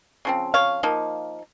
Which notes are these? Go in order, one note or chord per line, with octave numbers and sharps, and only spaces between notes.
C#3 F3 C4
C#5 F5
F3 A#3 D#4